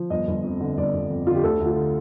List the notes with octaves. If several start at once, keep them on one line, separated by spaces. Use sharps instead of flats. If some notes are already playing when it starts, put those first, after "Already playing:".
Already playing: F3
G1 D#5
G1
F2
D3
G1 D5
G1
F2
D3 F4
G4
D2 A4
D2
F4
D3